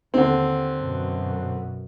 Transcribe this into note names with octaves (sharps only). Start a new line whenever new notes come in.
D#2 D3 C4
F#2 B2